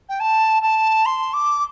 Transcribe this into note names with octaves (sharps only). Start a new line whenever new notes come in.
G5
A5
A5
C6
D6